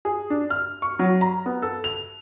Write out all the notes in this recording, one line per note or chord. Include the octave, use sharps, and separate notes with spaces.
G#4
D4
F6
C#6
F#3
A#5
B3
A4
F7